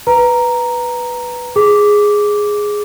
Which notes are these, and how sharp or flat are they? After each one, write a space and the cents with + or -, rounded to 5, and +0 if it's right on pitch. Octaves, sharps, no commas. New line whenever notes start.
B4 +0 A#5 +0
G#4 +0 D6 -10